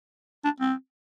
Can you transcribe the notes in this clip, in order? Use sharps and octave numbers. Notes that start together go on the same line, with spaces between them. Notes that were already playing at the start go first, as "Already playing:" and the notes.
D4
C4